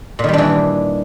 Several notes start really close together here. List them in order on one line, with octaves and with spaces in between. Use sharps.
A#2 D#3 G3 D4 E3